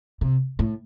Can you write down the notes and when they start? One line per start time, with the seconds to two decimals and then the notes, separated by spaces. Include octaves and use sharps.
0.21 C3
0.59 A2